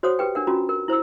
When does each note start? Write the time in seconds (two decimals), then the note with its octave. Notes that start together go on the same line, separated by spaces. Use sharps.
0.03 F#4 C5 C#5 F#5 D#6
0.19 G4 B4 G5
0.35 D4 A#4 F#5
0.47 C#4 F4 F#4 A#5
0.69 A#4
0.88 E4 C5 A#5 E6